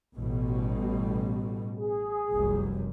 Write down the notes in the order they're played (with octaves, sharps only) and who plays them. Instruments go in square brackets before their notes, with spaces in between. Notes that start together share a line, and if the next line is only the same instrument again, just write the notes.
[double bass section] A1 B2 G3
[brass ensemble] G#4
[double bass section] F1 C2 F#2